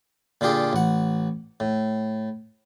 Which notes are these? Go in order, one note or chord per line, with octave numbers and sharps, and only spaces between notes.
A#2 D3 F4 G4 G#4
A1 F#5
A2